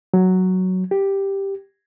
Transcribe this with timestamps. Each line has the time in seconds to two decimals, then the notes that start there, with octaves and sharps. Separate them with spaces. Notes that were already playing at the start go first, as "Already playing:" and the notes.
0.14 F#3
0.91 G4